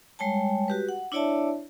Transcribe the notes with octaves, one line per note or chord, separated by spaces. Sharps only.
G3 G#3 C#5 G5 A5
F#4 G4 B4
F#5
D4 E4 C#5 D5 E5 A5